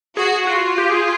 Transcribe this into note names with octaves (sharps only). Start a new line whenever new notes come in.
F#4 G#4
F4 F#4
G4
G#4